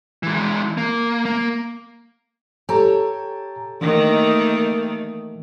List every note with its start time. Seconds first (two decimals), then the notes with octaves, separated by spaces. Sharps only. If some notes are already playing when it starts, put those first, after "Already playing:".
0.23 E3 G#3
0.77 A#3
1.25 A#3
2.69 G4 A4 C#5 G#5 A#5
3.81 D#3 E3 A3 A#3